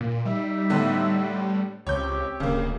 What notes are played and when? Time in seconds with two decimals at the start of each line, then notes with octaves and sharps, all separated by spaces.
0.01 A#2
0.25 G3 D#4 E5
0.70 A2 D3 B3
1.87 C#2 C4 G4 C#5 G6
2.40 D1 C#3 A#3